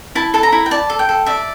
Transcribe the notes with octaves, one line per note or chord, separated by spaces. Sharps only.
E4 A5
A4 A5
A#5
E4
G5
D5 A5
A4
G5
A4
D5 E5